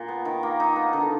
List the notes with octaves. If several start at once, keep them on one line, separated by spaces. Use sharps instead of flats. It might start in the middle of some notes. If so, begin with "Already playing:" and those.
Already playing: A#2
B3
D#3
A#3
D#4
B3
D3